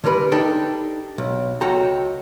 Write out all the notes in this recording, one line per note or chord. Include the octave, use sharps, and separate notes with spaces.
D3 G3 A#4 B4 B5
D4 D#4 G4 A4
B1
C#2 F#4 A4 G5 A#5